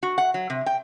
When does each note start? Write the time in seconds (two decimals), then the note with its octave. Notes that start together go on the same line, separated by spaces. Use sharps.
0.03 F#4
0.18 F#5
0.34 F#3
0.50 C3
0.66 G5